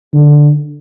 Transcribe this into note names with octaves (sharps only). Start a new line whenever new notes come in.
D3